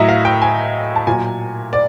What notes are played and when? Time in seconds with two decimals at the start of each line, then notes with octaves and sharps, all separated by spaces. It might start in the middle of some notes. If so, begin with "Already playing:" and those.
Already playing: A2 F#3 D#5 E5
0.09 F5
0.25 G5
0.42 G#5
0.96 A5
1.07 A#2 F#3 G#5
1.73 D5